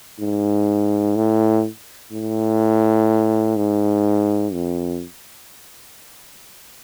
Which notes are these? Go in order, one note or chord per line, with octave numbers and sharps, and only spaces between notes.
G#2
A2
A2
G#2
F2